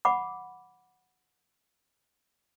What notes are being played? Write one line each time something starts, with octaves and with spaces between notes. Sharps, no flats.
F#5 B5 D6